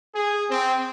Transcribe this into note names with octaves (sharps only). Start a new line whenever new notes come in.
G#4
C4